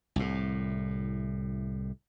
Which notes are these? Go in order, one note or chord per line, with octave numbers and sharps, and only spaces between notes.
C2 A2